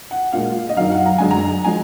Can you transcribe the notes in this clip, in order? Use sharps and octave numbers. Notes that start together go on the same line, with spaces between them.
F#5
A#2 G#3 F5
D#5
F#2 D#3 F#3 F5
F#5
A#5
F#2 D3 G#3 G#5
A#5
F3 G#3 G#5